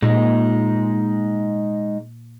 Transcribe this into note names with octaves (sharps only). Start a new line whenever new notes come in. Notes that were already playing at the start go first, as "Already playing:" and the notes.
A#2 G#3 D#4